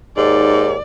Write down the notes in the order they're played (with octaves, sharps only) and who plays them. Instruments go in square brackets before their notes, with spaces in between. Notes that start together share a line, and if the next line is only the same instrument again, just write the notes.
[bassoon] D#2 [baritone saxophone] G#2 [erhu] D5